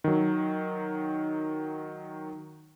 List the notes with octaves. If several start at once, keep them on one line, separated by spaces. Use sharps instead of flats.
D#3 F#3